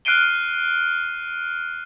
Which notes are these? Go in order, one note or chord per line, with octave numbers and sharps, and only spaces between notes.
F6 F#6 C7 D7 D#7 G7